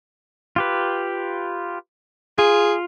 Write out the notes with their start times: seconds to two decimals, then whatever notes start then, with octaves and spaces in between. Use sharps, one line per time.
0.56 F4 G4 B4
2.38 F4 G#4